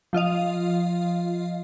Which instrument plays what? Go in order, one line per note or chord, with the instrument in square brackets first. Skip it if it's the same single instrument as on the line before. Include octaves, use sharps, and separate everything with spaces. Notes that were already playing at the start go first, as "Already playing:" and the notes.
[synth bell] F3 F4 D#5 F5